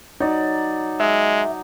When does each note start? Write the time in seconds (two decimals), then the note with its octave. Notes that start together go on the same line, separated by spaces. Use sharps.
0.20 F#3 D#4 D5
1.00 G#3 E5